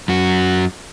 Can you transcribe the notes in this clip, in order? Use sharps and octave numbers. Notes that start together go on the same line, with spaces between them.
F#2 F#4